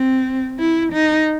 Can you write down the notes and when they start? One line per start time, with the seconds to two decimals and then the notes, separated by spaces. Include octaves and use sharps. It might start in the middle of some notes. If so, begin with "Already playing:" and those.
Already playing: C4
0.59 E4
0.93 D#4